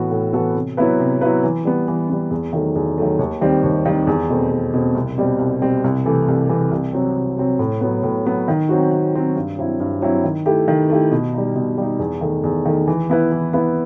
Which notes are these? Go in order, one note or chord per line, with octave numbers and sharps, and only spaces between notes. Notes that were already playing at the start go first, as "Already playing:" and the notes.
Already playing: A2 E3 B3 F#4 A4
A2
E3 B3 F#4 A4
C3
F#3 B3 E4 B4
C3
F#3 B3 E4 B4
E3
G3 B3
E3
G3 B3
E2
D#3 F#3 A3
E2
D#3 F#3 A3
D#2
D#3 G3 C4
D#2
D#3 G3 C4
E2
B2 A3 C4
E2
B2 A3 C4
C2
B2 G3 C4
C2
B2 G3 C4
C2
C3 E3 A3
C2
C3 E3 A3
C2
C3 F#3 C4
C2
C3 F#3 C4
A2
F#3 B3
A2
F#3 B3
D#3
F#3 C4 F#4
D#3
F#3 C4 F#4
G2
F#3 C4 E4
G2
F#3 C4 E4
D#3
A3 E4 G4
D#3
A3 E4 G4
B2
G3 D#4
B2
G3 D#4
E2
D#3 A3
E2
D#3 A3
E3
B3 E4 B4
E3
B3 E4 B4